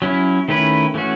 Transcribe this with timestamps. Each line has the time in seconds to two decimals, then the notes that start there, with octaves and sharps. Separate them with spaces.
0.02 F#3 C#4 E4
0.48 D#3 A3 C#4 E4 B4
0.94 E3 A3 C#4 F#4